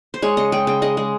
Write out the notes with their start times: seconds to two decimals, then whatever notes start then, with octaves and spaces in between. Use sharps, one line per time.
0.14 C5
0.22 G#3 C#5
0.37 C#3 D#5
0.52 G#3 G5
0.67 C#3 G5
0.82 G#3 D#5
0.97 G#3